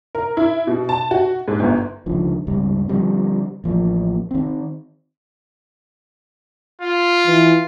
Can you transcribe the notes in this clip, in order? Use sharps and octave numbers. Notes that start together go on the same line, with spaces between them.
A#4
E4
B2
A5
F#4
G#2
G1
C#2 D3 D#3 F3
C#2 G2 C3 G3
D3 F3 G3 C4
A1 F3 A#3
D#3 C4
F4
E3